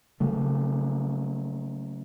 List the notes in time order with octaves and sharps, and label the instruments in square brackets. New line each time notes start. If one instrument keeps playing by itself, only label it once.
[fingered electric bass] C#3 F#3 A3